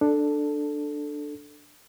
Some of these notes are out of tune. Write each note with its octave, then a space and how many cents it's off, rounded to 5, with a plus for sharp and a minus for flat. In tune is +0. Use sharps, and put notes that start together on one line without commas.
D4 +10 A4 +0